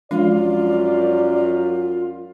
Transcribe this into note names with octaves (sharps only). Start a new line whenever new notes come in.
F#2 F3 G#3 D4 F4 D5